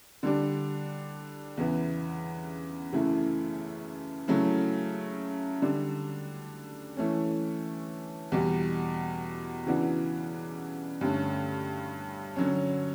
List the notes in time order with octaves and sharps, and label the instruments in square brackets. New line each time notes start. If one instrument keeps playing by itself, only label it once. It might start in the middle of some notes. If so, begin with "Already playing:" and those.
[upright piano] D3 G3 D4
E2 C#3 E3 B3 E4
F#2 C#3 E3 A3 E4
C#3 F#3 A3 E4
D3 G3 D4
E3 A3 C#4
E2 B2 G3
C#3 E3 B3 D4 F#4
G2 D3 A3 C#4
D3 F#3 C#4